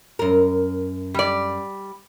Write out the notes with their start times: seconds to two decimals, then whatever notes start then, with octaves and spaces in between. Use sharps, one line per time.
0.19 F#2 A#4
1.14 G3 D5